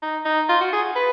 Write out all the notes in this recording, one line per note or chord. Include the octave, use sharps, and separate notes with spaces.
D#4
D#4
F4
F#4
G#4
B4